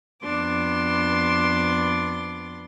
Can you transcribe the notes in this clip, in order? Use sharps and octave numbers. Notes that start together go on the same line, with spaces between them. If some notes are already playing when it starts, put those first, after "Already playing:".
F2 B3 D4 C6 D6